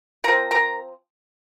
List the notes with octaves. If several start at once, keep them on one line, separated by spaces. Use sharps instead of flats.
F3 C4 A#4 A#5
A#4 A#5